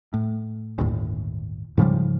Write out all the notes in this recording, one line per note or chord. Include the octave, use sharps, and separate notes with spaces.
A2
G1 D#2 A2
G#2 C#3 F3 G3